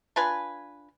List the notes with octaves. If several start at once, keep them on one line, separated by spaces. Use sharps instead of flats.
D4 F4 B4 G#5